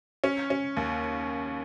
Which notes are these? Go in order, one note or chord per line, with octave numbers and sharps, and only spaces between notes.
C#4
C#4
D#2